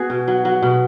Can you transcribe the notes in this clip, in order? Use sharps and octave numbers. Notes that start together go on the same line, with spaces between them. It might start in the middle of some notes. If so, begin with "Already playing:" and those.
Already playing: B3 F#4 G#4
B2
F#3
F#3
B2